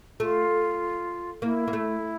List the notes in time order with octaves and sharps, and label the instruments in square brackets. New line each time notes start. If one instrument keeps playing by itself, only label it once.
[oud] A3 [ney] F4
[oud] A#3 [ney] E4
[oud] A#3
A3